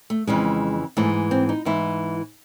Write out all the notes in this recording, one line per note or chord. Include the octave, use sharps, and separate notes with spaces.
A3
F2 C#3 E3 G#3
G#2 E3 A3
C4
D#4
G#2 E3 E4